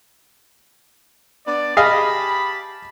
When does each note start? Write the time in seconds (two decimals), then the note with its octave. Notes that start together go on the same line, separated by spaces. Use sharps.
1.47 B3 D4 D5
1.77 G4 G#4 D#5 F5 A5 B5